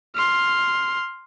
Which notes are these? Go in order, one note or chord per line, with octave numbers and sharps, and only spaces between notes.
C6 F6